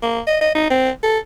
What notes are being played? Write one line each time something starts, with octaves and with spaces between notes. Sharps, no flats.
A#3
D#5
D#5
D#4
C4
A4